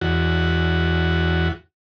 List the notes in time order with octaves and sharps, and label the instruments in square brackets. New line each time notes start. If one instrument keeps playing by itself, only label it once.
[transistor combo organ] E2 F#4